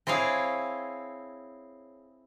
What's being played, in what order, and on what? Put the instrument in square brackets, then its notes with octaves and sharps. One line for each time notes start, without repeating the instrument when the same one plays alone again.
[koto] C4 E4 G#4 C#5 F5